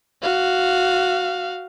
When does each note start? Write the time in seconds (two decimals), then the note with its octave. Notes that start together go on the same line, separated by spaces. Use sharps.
0.22 F#4 F5